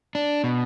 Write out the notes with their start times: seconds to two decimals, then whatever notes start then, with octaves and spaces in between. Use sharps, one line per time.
0.15 D4
0.44 B2